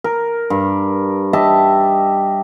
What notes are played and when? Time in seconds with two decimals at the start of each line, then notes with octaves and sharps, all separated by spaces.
0.04 A#4
0.50 G2
1.33 G4 D#5 E5 A5